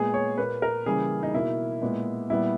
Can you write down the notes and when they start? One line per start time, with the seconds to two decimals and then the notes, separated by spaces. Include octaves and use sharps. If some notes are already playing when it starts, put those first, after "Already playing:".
Already playing: A#2 G#3 B3 G#4
0.14 C#5
0.38 A#2 A#3 B4
0.62 A#4
0.86 C#3 E3 G3 A#3 G#4
1.23 D#4
1.33 B2 A#3 E4
1.82 A#2 G#3 B3
2.30 A#2 G3 B3 E4